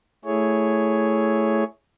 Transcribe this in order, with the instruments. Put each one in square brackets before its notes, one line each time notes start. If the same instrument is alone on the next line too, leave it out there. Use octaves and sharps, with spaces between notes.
[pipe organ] A3 E4 G#4 C#5